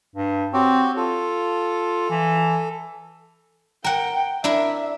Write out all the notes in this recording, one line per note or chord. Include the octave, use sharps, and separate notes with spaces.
G2
C4 F#4 G4 C#5
F4 A4
E3
A#4 F#5 G5
D4 E4 A#4 E5